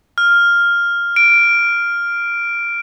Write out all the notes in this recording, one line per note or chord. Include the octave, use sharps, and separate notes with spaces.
F6
D7